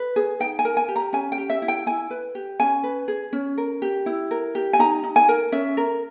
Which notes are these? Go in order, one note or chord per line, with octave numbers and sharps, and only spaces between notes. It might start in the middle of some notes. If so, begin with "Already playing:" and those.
Already playing: B4
G#4
D#4 G5
G#5
A#4
G#5
G4
A#5
C#4 G#5
G5
G4
E5
E4
G5
E4 G#5
B4
G4
C#4 G#5
B4
G#4
C#4
A#4
G4
E4
A#4
G4
G#5
D#4 A#5
D#4
G#5
A#4
C#4 E5
A#4